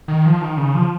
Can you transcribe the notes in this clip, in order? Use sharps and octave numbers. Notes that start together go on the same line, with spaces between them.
D#3
F3
D#3
C#3
F3